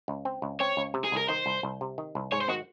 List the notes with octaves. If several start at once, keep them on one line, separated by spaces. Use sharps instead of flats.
C#2
C4
C#2
C4 C#5
C#2
C3
G#4
C2 A#4
D#3 C5
C2
C2
C3
D#3
C2
G#2 C#5
C5
D#3 F#4